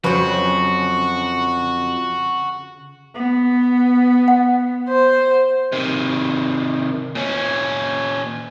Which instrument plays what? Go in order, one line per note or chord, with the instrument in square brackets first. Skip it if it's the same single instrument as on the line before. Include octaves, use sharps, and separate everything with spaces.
[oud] F2 F#3 [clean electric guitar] C#3 [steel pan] F3 B4 C5 [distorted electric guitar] F#4
[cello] B3
[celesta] F#5
[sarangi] C5
[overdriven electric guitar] C3 D#3
A#2 C#4